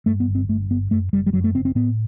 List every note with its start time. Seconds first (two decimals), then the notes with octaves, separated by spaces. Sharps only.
0.06 G2 A3
0.20 B3
0.28 G1
0.35 C4
0.49 G2 A3
0.71 G1 B3
0.91 F#2 A3
1.13 F#1 G3
1.27 G3
1.33 F#2 F#3
1.44 A3
1.54 F#1 C4
1.65 C4
1.75 A2 B3